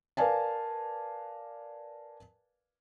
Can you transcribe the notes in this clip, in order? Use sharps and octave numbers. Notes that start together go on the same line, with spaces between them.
A#4 B4 D5 F5 G#5 A5